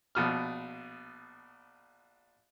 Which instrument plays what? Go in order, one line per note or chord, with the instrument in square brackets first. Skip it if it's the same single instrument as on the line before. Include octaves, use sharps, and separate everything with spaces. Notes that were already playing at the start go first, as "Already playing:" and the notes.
[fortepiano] A#1 B2 F6